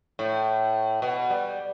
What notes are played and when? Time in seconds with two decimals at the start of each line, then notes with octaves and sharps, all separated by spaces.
0.19 A2
1.02 B2
1.30 G3